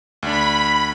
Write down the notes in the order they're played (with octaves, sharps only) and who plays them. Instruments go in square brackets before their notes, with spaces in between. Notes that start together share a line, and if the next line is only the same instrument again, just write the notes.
[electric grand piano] D2 D4 [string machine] B5